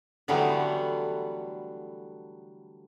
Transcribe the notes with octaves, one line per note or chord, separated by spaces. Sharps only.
D3 E3 F#3 G3 A3 B3